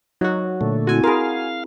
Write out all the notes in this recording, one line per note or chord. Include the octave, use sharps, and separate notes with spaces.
F#3 D#4 F#4
A#2 D3 A3
C4 E4 F#4 G#5
G#4 A#4 F5 B5 C6